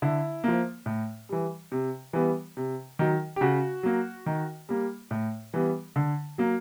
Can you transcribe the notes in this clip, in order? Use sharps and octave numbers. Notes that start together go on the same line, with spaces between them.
D3 E4
F3 A#3
A2
E3 G3
C3
E3 G3 B3
C3
D#3 F#3
G4
C#3 F#4
F#3 A#3
D#3
G3 A#3
A2
E3 G3 B3
D3
F#3 A#3